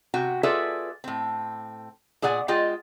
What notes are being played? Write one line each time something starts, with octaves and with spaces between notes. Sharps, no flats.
C3 F#4 G5
F4 G#4 A4 B4 D5 E5
A2 C4
A#2 G#4 D5 F#5 G#5
G#3 F4 G#4 D#5 G5